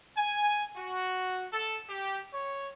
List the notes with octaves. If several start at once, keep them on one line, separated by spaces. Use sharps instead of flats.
G#5
F#4
A4
G4
C#5